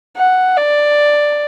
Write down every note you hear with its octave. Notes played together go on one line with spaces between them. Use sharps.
F#5
D5